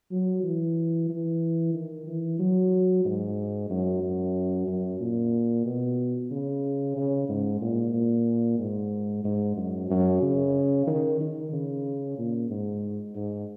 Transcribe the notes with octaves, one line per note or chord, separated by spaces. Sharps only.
F#3
E3
E3
D#3
E3
F#3
G#2
F#2
F#2
F#2
A#2
B2
C#3
C#3
G#2
A#2
A#2
G#2
G#2
F#2
F#2
C#3
D#3
D#3
C#3
A#2
G#2
G#2